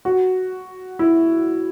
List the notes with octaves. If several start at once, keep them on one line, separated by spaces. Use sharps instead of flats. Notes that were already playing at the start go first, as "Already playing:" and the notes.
F#4
E4